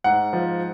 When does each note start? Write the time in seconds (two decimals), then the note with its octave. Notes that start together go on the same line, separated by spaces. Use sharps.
0.04 G#2 F#5
0.33 F3